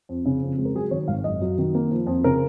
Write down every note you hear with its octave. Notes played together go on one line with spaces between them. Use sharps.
F2
C#3
F2
G#3
A#4
F#3 G#4
D#3 C#5
G#1 F5
F#2 D#5
F#3
D#3
A#3
F3
F2
C#3 A#4